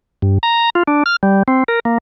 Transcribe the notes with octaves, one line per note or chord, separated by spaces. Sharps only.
G2
A#5
F4
D4
F6
G3
C4
A#4
A#3